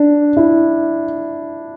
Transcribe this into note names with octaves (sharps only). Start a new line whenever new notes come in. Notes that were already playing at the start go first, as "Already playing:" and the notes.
Already playing: D4
E4